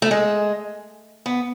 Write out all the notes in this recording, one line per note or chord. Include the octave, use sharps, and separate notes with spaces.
A3
G#3
B3